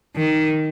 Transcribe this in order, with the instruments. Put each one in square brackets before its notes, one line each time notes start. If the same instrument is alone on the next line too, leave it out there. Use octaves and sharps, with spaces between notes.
[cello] D#3